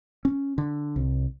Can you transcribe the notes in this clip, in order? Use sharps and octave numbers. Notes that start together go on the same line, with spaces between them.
C#4
D3
C2